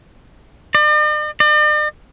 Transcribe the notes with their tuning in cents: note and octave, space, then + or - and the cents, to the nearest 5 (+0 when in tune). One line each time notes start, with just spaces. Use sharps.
D5 +45
D5 +45